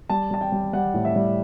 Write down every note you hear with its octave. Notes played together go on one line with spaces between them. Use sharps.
G3 A5
G3 A5
G5
G3
G3 F#5
A2
E5
G3